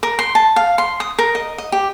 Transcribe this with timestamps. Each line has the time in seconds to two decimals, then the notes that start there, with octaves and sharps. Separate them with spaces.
0.03 A#4
0.19 C6
0.35 A5
0.56 F5
0.78 C6
1.00 D#6
1.19 A#4
1.35 D#5
1.58 D#5
1.72 G4